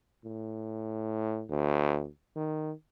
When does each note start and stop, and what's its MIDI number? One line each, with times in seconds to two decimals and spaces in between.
0.25 1.45 45
1.50 2.07 38
2.36 2.72 51